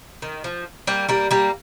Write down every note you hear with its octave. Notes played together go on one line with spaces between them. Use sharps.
D#3
F3
G3 A#3
G3 A#3
G3 A#3